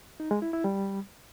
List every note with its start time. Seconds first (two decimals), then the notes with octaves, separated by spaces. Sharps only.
0.20 D#4
0.31 G#3
0.42 E4
0.53 E4
0.64 G3